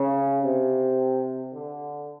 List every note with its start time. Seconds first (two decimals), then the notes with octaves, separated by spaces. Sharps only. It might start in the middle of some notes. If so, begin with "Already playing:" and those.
Already playing: C#3
0.43 C3
1.54 D3